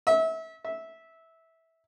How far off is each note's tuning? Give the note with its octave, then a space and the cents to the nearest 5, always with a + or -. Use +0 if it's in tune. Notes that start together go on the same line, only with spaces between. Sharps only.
E5 -30
E5 -15